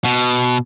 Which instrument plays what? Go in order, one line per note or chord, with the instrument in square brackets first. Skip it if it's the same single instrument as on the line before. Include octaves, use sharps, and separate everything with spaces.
[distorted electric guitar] B2